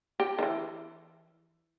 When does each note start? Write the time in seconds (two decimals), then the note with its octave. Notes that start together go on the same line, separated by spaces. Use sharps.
0.20 G4
0.39 D#3 E3